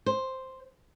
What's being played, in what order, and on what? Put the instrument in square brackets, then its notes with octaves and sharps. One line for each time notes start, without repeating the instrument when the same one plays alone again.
[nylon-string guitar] C5